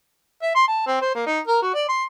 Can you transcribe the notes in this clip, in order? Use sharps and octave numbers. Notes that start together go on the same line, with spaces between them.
E5
C6
A5
C4
C5
A#3
D#4
A#4
F#4
D5
C6